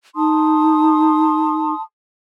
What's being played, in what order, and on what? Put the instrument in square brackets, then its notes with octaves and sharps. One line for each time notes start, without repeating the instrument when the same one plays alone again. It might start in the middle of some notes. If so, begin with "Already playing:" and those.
[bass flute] D#4 [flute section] A5 C6 D#6